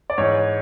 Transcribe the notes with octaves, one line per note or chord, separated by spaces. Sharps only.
D5
G#2 E3 C#5